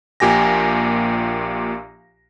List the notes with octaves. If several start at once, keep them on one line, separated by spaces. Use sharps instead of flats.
A#1 A#2 G4 G#5 A#6